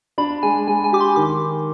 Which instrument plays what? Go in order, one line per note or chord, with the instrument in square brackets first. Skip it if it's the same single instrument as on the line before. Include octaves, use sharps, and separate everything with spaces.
[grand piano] D4 [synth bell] B5
[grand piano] G#3 [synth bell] G#5
[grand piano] G#3 [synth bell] G#5
[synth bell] G#5
[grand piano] G4 [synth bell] D6
[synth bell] C6
[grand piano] D#3 [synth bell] D6